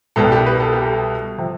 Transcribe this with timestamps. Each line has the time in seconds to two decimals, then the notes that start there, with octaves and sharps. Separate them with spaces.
0.16 C2 B2 G3 B3 A4
0.32 G4
0.46 B4
0.60 A4
0.73 G4
0.86 A4
1.38 C3 F3